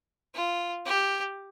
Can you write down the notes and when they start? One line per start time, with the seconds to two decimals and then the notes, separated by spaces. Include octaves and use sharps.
0.35 F4
0.86 G4